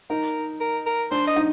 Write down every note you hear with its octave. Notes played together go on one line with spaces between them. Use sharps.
D#4 A#4
A#4
A#4
D4 C5
D#5
D#4